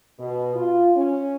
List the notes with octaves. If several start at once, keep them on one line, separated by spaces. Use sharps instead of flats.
B2
F4
C#4